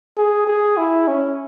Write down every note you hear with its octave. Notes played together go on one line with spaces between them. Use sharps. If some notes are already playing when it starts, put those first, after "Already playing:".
G#4
G#4
E4
C#4